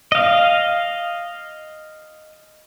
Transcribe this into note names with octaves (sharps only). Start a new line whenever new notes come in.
D#5 F5